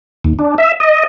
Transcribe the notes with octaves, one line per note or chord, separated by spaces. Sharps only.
D#2
D4
E5
D#5